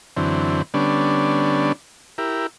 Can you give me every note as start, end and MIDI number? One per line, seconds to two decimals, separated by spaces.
0.16 0.62 42
0.16 0.62 50
0.16 0.62 52
0.16 0.62 60
0.74 1.72 50
0.74 1.72 55
0.74 1.72 59
0.74 1.72 61
0.74 1.72 62
2.18 2.47 64
2.18 2.47 67
2.18 2.47 70